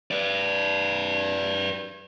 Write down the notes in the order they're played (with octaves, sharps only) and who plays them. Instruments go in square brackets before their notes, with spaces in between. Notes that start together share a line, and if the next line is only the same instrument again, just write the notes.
[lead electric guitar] B4 D5